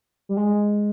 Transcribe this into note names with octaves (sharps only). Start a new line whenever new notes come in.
G3
G#3